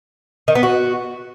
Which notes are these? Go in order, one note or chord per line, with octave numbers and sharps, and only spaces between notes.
D#3
B3
F#4